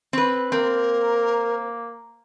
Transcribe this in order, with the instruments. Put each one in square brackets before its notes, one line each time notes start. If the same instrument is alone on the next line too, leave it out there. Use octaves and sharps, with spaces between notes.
[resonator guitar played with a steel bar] C4 B4
[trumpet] A#3 [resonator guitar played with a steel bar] C4 [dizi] A#4